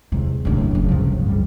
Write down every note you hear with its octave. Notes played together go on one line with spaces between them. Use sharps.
E2 C3 G#3
D#1 C#2 F#2 A2 D4
F#1 A2
C#2 G2 C3 F3
G#2 F3 G3